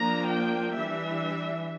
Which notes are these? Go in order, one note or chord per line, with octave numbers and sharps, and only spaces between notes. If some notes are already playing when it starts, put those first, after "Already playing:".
Already playing: F3 A#3 D4 A#5
G5
E3 G3 D4 E5